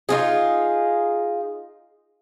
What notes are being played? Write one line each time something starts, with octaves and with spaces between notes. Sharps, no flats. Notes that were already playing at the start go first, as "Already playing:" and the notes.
D#4 F4 G#4